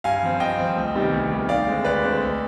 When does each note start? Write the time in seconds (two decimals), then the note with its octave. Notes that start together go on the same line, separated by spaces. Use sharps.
0.04 G2 F5 G#5
0.23 F3 C4
0.40 G2 D#5 G5
0.58 F3 C4
0.77 D2
0.95 C3 D#3 G3 B3
1.13 D2
1.31 C3 D#3 G3 B3
1.49 D2 D5 F5
1.67 D3 G#3 C4
1.85 D2 B4 D5
2.03 D3 G#3 C4
2.21 D2